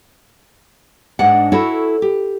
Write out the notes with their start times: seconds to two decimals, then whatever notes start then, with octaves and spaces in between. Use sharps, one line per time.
1.19 G#2 G#3 D4 F#5
1.52 E4 F#4 A4 C#5
2.02 G4